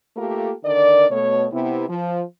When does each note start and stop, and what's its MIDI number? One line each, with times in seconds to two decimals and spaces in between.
0.17 0.52 57
0.17 0.52 58
0.17 0.52 65
0.17 0.52 67
0.17 0.52 69
0.17 0.52 70
0.64 1.06 50
0.64 1.06 51
0.64 1.06 70
0.64 1.06 74
1.10 1.46 47
1.10 1.46 57
1.10 1.46 73
1.52 1.85 48
1.52 1.85 59
1.52 1.85 64
1.89 2.21 53